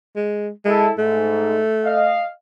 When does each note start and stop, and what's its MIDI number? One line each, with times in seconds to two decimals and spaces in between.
0.16 0.50 56
0.65 0.88 56
0.65 0.91 64
0.65 0.91 69
0.98 1.61 44
0.98 2.23 57
1.85 2.24 75
1.85 2.24 77